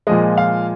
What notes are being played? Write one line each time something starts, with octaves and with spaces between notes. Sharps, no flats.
A#2 F3 G#3 D#5
F5